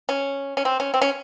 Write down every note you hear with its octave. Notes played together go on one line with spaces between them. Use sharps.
C#4
C#4
C4
C#4
C4
C#4